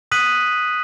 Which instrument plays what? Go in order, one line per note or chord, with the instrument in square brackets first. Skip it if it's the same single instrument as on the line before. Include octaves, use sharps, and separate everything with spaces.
[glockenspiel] D#6 F#6 B6 D#7 F#7